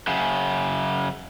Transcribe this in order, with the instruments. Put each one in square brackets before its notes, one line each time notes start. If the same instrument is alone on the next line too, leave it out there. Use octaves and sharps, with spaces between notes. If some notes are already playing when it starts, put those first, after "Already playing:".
[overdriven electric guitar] F#2 C#3